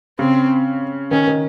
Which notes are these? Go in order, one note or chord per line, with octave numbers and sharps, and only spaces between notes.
C#3 C4
D#3 C#4
D#3